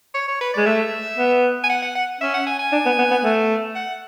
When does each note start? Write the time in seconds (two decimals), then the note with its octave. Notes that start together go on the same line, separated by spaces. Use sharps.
0.15 C#5
0.28 C#5
0.41 B4
0.54 G#3 D5
0.66 A3 E5
1.18 B3
1.64 G#5
1.70 F#5
1.82 F#5
1.96 F#5
2.21 C#4 E5
2.34 F#5
2.47 G#5
2.59 G#5
2.72 D4
2.86 B3
2.99 B3
3.11 B3
3.24 A3
3.75 F#5